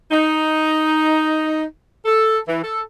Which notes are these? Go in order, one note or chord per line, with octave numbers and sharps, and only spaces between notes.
D#4
A4
E3
A4